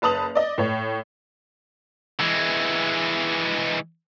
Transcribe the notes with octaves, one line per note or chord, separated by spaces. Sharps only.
F#1 B4 A5 D#6 F7 F#7
D5 D#5
A2 C#5
E3 G#3